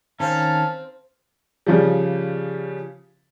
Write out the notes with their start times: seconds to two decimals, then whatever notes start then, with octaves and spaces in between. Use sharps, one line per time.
0.20 D#3 C4 C#4 C5 F5 A5
1.67 C#3 F3 G3